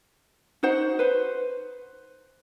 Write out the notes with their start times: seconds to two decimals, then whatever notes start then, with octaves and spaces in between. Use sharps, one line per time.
0.63 D#4 F#4 C5 F#5
0.99 B4 C5